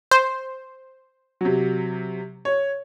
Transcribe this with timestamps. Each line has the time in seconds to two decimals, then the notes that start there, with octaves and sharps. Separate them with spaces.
0.11 C5
1.41 C3 F#3
2.45 C#5